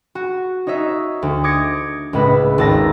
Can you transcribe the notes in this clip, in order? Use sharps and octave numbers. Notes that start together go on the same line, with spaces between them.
F#4
D#4 C#5 D#5 E5
D2
D6 D#6 G#6 A#6 C#7
C#2 A2 G#3 B4 E5
G#1 D#2 A5 E6 A#6